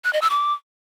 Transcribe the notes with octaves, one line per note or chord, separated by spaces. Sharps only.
F#6
D#5
E6
D6